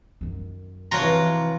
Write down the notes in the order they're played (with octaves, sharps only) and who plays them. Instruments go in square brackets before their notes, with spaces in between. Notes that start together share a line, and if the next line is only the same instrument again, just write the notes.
[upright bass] F#2 D#3
[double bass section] C3 E3 [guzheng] F3 F4 F#4 [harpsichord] C#5 A#5